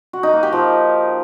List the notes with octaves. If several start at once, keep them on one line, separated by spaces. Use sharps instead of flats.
F#4
D#4
A#3
G4
F3